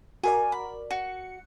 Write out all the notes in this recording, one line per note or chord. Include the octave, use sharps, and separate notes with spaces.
F#4 A#4 D5 G#5
B5
F#4 C#7